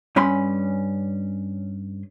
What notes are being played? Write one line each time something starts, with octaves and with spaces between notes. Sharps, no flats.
G2 C#4 G#5 B5 C6